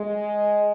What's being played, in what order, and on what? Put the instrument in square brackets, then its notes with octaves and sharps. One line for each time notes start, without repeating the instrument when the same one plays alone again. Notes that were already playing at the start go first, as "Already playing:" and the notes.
Already playing: [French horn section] G#3